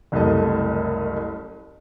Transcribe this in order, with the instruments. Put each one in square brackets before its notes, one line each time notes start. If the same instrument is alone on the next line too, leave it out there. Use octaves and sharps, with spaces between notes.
[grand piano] F#1 C2 A3 D#5 A5